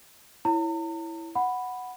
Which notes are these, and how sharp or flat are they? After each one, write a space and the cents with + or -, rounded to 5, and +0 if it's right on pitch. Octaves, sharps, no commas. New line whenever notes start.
E4 +0 C#5 +0 A#5 -45
F#5 +0 B5 +5